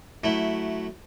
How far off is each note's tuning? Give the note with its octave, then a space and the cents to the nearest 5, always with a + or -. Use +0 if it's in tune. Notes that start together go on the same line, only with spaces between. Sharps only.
F#3 +0 A3 +0 E4 -10